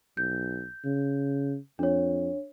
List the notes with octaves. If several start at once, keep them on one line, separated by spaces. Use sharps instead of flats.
B1 G6
C#3
F2 D4 C#5